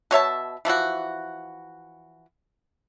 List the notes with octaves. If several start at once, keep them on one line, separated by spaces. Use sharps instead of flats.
B2 C#5 E5 A5
E3 F3 E4 F#4